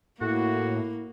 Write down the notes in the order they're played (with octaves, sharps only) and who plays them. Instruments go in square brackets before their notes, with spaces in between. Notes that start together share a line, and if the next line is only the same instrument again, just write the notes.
[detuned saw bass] A2 [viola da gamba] A#3 [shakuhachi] E4 [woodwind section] F#4